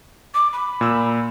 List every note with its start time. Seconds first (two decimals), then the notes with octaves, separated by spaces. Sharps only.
0.34 D6
0.53 B5
0.81 A#2 E6